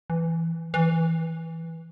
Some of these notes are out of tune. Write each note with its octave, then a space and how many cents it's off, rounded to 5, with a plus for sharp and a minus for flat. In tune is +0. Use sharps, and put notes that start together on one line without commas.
E3 +5
E3 -10